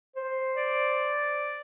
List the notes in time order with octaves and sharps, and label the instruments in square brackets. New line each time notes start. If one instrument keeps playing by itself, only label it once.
[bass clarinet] C5
[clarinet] D5